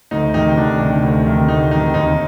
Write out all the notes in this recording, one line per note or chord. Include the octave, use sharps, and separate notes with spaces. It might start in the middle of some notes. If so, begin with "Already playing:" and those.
D2 D#4
C3 D#3 D#4
D2 D4
C3 D#3
D2
C3 D#3
D2 D#4
C3 D#3 D#4
D#2 D#4